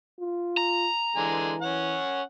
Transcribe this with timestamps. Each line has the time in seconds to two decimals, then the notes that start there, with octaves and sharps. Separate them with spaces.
0.20 F4
0.57 A#5
1.16 D3 E3 G#3 G#5
1.62 C#4 F#5